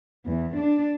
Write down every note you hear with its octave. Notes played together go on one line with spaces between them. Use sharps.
E2
D4